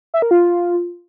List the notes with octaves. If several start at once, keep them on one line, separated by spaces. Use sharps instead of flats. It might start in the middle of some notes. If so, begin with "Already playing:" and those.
E5
A#4
F4